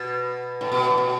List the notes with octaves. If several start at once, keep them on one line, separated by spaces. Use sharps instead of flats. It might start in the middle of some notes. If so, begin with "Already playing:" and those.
Already playing: B2
A2
B2
A2
B2